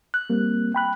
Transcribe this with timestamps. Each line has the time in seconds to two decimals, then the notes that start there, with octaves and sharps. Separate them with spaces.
0.14 F#6
0.30 G3 A#3 C4
0.75 G5 B5 F#6